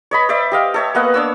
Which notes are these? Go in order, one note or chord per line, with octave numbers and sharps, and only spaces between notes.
C#5 D#5 B5
C5 D5 E5
G4 D#5 F5
A4 C#5 E5
A#3 B3 D#5 F#5
D4 C#5 E6